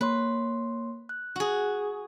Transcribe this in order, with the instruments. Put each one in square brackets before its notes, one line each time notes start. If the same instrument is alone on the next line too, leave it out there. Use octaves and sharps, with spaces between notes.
[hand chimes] A#3 C#5 C6 [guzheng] B4
[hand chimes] F#6
[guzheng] F#4 G#4